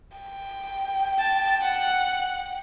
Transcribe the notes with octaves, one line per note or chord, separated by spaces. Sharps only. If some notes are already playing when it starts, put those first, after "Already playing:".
G5
A5
F#5